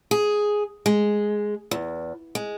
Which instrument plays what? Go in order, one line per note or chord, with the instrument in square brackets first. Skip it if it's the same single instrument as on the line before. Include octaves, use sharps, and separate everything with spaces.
[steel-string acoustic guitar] G#4
G#3
E2
G#3